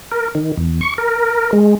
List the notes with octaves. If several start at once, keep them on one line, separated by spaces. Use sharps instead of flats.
A#4
D#3
E2
C#6
A#4
G#3